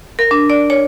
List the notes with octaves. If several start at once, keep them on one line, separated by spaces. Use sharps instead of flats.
A#4
D4
D5
C#5